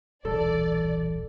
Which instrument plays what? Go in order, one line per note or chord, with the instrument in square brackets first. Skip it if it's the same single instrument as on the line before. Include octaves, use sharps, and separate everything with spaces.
[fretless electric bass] D#1 B1 [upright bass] E3 [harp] A4 [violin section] D5